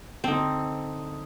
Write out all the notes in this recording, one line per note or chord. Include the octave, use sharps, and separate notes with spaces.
D3 C4 D#4